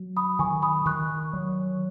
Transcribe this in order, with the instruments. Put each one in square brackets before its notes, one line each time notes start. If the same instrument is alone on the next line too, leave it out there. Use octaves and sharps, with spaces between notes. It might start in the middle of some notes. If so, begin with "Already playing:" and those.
Already playing: [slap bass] F#3
[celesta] B5 D#6
[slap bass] D#3 [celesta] G#5 C#6
[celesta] B5 D#6
[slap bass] D#3 [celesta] C#6 F#6
[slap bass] F#3